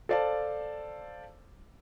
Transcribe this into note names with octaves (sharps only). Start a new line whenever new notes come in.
A4 C5 D5 F5 A5